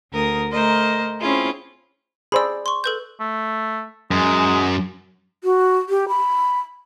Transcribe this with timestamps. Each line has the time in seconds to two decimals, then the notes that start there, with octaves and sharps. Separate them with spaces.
0.11 D2 A#4 D#6
0.53 A3 A#4 C5 D#5
1.20 C4 C#4 E4 F4 G#4
2.32 G#4 C5 D5 B5 E6
2.66 C6 C#6
2.84 A4 B4 G6
3.20 A3
4.11 F#2 G#3
5.44 F#4
5.89 G4
6.08 B5